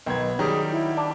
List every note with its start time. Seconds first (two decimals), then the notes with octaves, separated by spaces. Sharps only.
0.06 B1 D#3 B3 G#6
0.39 D#3 F#3 G3 G#4
0.71 E4
0.97 D4